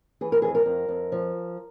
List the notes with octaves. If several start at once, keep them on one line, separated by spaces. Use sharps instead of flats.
E3 G#4
A#4
F2 G#4
A#4
F2
F2
F3